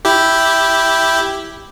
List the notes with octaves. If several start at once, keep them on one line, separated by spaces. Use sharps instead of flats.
E4 G4